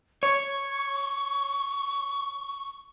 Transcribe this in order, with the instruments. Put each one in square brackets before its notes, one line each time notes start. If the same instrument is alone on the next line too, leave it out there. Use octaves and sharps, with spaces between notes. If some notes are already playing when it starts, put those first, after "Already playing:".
[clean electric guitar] C#5 [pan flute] C#6